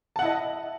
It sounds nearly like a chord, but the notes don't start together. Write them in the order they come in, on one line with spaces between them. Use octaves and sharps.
A5 F#5 E4 D#5